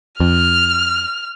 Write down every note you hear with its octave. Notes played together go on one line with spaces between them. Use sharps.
F2 F6